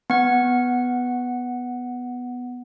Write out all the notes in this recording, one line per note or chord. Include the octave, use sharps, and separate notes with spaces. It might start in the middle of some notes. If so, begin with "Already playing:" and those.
B3 F#5